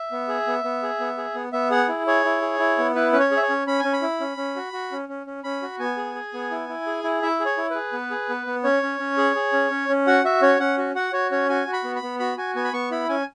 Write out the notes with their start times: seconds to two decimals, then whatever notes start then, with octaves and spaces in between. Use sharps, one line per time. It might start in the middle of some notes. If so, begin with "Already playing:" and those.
Already playing: E5
0.11 B3
0.28 G#4
0.47 B3
0.64 B3
0.83 G#4
1.00 B3
1.17 G#4
1.35 B3
1.53 B3 E5
1.70 G#4 F#5
1.88 E4
2.07 G#4 C#5
2.25 E4
2.42 G#4
2.59 E4
2.78 B3
2.95 E4 B4
3.13 C#4 B4
3.20 C#5
3.31 G#4
3.37 E5
3.42 C#5
3.49 C#4
3.67 C#4 B5
3.80 C#4 G#5
3.93 B5
4.02 E4
4.20 C#4
4.37 C#4
4.56 F#4
4.73 F#4
4.92 C#4
5.09 C#4
5.27 C#4
5.44 C#4 B5
5.62 F#4
5.79 B3 G#5
5.97 G#4
6.15 G#4
6.34 B3
6.51 E4
6.69 E4
6.86 G#4
7.04 E4
7.22 E4 E5
7.40 G#4
7.45 C#5
7.57 E4
7.70 G#4 B4
7.93 B3
8.11 G#4
8.29 B3
8.46 B3
8.64 C#4 C#5
8.83 C#4
8.99 C#4
9.17 G#4
9.35 G#4
9.53 C#4
9.71 C#4
9.89 C#4
10.07 F#4 F#5
10.24 F#4 E5
10.42 C#4 C#5
10.59 C#4 F#5
10.78 F#4
10.95 F#4 F#5
11.13 F#4 C#5
11.31 C#4 C#5
11.49 F#4 G#5
11.67 F#4
11.73 B5
11.84 B3
11.96 B5
12.02 B3
12.20 F#4 B5
12.37 F#4 G#5
12.55 B3 G#5
12.65 B5
12.73 B3 C#6
12.91 E4 B5
13.09 C#4 G#5